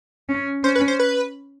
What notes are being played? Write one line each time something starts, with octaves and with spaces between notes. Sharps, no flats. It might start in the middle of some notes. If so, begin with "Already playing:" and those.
C#4
C#4 C5
B4
C5
B4